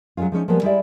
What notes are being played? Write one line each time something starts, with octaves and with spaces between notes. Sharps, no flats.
F#3 G#3 A3 C#4 F4
F3 G#3 C#4 D#4
F3 G3 G#3 A#3 B3
G3 G#3 E4 G4 D5 E5